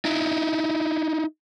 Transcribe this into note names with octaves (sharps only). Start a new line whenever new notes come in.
D#4 E4